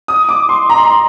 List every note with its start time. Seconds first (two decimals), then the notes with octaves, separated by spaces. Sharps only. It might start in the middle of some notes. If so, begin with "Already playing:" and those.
0.08 D#6
0.29 D6
0.49 C6
0.70 A#5
0.78 C6
0.85 A#5